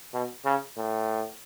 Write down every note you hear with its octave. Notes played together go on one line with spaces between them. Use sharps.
B2
C#3
A2